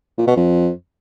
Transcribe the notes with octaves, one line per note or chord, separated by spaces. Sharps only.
A#2
B2
F2